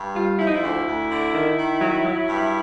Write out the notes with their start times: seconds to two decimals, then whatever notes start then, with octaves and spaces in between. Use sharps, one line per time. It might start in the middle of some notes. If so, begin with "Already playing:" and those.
Already playing: G2
0.15 G3 F4
0.39 F3 E4
0.47 D#4
0.55 E4
0.63 D2
0.87 D2
1.10 D3
1.34 D#3
1.57 D#3
1.81 F#3
2.05 F#3
2.29 G2